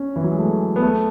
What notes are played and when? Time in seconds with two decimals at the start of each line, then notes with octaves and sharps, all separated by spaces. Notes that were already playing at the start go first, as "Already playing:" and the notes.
Already playing: C#4
0.16 E3
0.24 F#3
0.31 G#3
0.38 A3
0.76 B3
0.82 A3